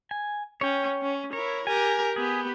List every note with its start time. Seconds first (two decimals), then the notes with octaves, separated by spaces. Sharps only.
0.11 G#5
0.61 C#4 C#5 G5
1.02 C#4
1.33 E4 A#4 C#5
1.67 G4 A#4 G#5
2.16 B3 G4 G#4